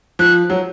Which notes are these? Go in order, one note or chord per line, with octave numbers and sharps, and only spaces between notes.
F3 F#6
F#3